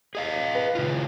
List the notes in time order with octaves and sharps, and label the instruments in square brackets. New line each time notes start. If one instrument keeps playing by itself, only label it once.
[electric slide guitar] G#4 D#5 F5
[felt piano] B4
[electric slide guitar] C#3 E4 F4